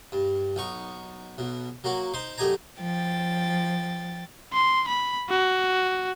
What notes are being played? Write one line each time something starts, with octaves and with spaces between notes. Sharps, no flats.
G2
B1 D#4 C#6
B1 B2
F#3 A#3 F#4
D#4 C5 C6
F#2 A3 G4 D#5 G#5 A#5
F3 G5 A6
C6
B5
F#4